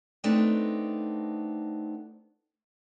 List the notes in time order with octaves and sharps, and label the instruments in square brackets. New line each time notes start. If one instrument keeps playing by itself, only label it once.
[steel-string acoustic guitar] A3 B3 C4 D4 D#4